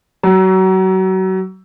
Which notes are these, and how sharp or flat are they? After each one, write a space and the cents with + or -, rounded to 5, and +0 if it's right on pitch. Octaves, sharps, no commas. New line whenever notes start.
F#3 +30